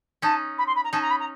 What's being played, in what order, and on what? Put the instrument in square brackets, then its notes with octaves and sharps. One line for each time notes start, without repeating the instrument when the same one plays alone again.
[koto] C#4 D#4 [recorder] A5
[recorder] B5
C6
B5
A#5
[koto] C#4 D#4 [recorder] A5
[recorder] A#5
B5
A#5